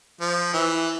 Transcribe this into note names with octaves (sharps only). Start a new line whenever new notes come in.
F3
E3